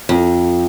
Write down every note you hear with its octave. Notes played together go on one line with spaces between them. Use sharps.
F2